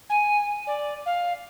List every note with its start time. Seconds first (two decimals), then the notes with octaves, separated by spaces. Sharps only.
0.09 G#5
0.67 D5
1.06 F5